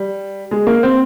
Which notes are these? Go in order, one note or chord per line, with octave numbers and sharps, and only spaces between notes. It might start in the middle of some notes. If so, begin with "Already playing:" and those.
Already playing: G3
G#3
A#3
C4